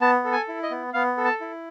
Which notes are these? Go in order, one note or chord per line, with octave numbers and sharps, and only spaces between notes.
B3 A5
A4
G#5
E4
D#5
B3
B3 F5
A4
A5
E4